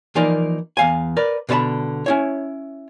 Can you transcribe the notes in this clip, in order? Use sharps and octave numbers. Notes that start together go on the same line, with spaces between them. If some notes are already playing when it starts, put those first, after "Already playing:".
E3 F3 A#3 D#4 A#4 D5
E2 F5 G#5
A#4 B4 D5
B2 D3 D5 A5 B5
C#4 E4 C#5